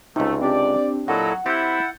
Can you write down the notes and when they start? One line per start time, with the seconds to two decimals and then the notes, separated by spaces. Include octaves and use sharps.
0.16 C#2 C3 A3 D#4
0.41 C4 D4 G4 D5
1.08 A#2 F#3 E4 A4 D#5 F#5
1.46 C4 E4 G4 F#5 G6 A6